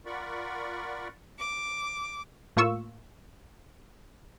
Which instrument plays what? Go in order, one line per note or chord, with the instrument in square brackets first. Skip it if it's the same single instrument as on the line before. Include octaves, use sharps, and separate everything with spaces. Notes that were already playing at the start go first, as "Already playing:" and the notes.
[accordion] F4 A#4 D5 F#5 B5 C#6
[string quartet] D6
[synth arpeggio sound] A2 A#3 F4 C#6 E6